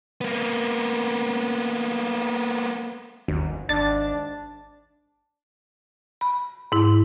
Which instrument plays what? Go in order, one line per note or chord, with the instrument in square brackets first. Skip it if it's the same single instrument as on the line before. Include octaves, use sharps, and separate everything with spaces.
[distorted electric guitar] A#3 B3
[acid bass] G1 [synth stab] D#2
[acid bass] G#1 [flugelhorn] D4 [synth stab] A6
[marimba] B5
G#2 E4